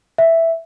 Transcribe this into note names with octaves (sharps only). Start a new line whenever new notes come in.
E5